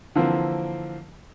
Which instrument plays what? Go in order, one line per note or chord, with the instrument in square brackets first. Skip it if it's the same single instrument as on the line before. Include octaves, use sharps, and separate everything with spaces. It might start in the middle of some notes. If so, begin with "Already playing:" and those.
[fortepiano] D3 E3 F3 A#3 C4